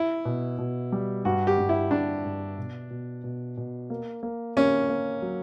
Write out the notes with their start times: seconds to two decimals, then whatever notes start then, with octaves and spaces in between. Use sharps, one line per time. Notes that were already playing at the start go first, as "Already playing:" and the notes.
Already playing: E4
0.25 B2
0.58 B2
0.92 G3
1.25 G2 F#4
1.47 G4
1.58 G2
1.69 E4
1.91 G2 D4
2.25 G2
2.58 B2
2.90 B2
3.24 B2
3.57 B2
3.90 A#3
4.23 A#3
4.57 A#3 C#4
4.89 A#3
5.22 F#3